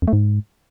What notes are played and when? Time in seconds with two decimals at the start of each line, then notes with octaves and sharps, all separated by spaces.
0.02 F2
0.08 A3
0.13 G#2